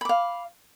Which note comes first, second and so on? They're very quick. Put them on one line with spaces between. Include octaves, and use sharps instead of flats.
B5 D6 F5